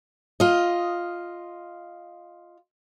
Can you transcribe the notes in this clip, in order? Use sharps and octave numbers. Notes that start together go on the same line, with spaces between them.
F4 D#5